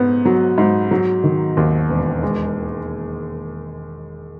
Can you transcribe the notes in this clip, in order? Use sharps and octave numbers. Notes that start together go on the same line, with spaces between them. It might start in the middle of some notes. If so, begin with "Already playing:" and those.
Already playing: G#2 B3
F#3
G#2
F#3
D#3
D#2
E1
G#3